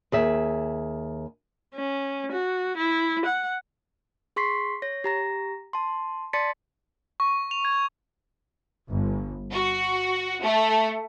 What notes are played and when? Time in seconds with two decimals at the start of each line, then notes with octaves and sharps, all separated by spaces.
0.12 D#2 G#4 E5
1.75 C#4
2.31 F#4
2.77 E4
3.25 F#5
4.36 G#4 C6 C#6 B6 C7
4.82 C#5 A#6
5.04 G4 A#5 A#6
5.73 A5 C6
6.33 D5 A5 C6 A6 B6 C#7
7.20 C#6
7.51 F7
7.65 G#6
8.88 G1
9.52 F#4
10.42 A3